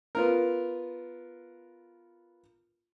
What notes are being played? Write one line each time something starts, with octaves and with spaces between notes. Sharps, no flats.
B3 F4 A#4